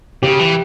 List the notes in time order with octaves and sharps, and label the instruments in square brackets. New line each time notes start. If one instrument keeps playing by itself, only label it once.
[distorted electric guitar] C#3 [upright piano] G4
[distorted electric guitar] E3